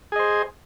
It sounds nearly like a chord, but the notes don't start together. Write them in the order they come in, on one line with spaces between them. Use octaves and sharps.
G#4 D#5 C5